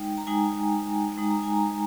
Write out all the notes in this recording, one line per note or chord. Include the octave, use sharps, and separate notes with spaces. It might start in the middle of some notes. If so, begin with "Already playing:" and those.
Already playing: G#3 D#4 G5
A#5
G#3 D#4 G#5
G#3 D#4
A#5
G#5
A#5